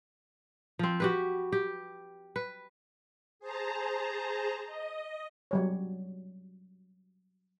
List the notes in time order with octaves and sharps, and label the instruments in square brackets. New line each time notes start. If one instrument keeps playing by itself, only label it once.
[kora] F3 C4
F#4 G4 B4
G4
B4
[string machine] G#4 C5 A5 A#5
D#5
[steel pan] F#3 G3 C#5